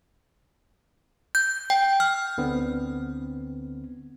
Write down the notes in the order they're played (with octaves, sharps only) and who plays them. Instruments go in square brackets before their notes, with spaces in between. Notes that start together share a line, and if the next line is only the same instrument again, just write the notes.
[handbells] G6
G5
F6
[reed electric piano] D2 D3 B3 C4